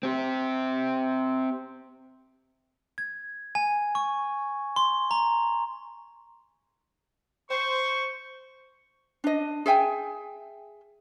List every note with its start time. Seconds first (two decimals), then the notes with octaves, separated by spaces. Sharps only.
0.03 C4 G4
2.98 G#6
3.55 G#5
3.95 C#6
4.76 C6
5.11 A#5
7.51 C5 C#6
9.24 D4 D#5
9.66 G#4 E5 G5 G#5